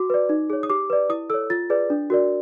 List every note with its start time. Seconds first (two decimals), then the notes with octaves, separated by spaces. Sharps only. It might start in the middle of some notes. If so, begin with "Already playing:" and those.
Already playing: F#4 D6
0.10 B4 D5
0.29 D#4
0.50 G#4 C#5
0.63 D#6
0.70 G4 D6
0.90 B4 D5
1.09 E4 D#6
1.30 A4 C#5 E6
1.50 F4 A6
1.70 G#4 B4 D5
1.90 D4
2.10 F#4 A#4 D5